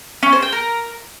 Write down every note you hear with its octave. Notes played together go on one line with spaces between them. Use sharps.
C#4
C5
G5
A#4